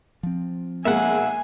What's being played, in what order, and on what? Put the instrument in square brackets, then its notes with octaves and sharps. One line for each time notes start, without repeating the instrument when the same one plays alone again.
[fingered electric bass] F3 C4
[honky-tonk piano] B1 G#3 A#3 [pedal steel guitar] E5 F#5 [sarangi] G#5